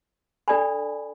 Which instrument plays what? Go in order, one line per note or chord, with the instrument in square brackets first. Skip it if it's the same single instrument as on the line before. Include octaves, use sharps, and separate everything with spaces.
[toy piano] D4 A4 D5 G#5 B5